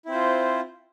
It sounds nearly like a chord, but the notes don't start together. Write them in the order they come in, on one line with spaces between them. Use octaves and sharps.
E4 C4 C5 F4